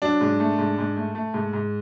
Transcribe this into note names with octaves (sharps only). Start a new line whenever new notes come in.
F#3 D4
G#2
A3
G#2
G#2
A3
A3
G#2
G#2